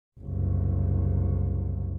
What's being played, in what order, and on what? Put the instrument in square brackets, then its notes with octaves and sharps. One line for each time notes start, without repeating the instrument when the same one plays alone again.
[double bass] F#1 C2